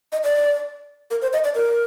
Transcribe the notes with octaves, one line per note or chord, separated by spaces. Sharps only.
D#5
D5
A#4
C5
D#5
D5
A#4